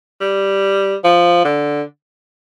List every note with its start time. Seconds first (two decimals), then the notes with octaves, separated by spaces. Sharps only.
0.21 G3
1.04 F3
1.45 D3